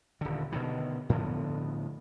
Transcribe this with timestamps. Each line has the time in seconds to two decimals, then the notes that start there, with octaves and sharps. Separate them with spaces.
0.21 D#1 D3
0.52 B2 D3 D#3
1.09 A2 D3 F3 B3